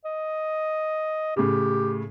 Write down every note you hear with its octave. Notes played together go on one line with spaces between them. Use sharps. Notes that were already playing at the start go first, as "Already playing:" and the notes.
D#5
A2 C#3 G4